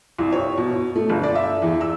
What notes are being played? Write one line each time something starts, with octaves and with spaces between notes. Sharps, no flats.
C2
C#5
B2
A3
G1
D5
E5
E2
E6